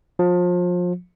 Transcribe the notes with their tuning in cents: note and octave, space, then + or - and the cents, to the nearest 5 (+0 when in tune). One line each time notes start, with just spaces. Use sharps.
F3 +30